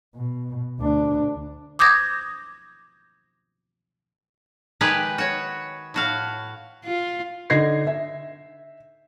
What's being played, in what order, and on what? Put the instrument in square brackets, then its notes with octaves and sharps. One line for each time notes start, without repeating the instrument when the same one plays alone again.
[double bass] B2
D2 D4
[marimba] D6 D#6 G6 G#6 A#6
[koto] D#3 G#3 G4 G#4 B4
F#4 C#5
A2 F#4 F5
[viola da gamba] F4
[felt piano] D3 D#4 D#5 G#6 A#6 C7
E5